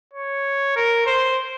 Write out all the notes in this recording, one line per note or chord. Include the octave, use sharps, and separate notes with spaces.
C#5
A#4
C5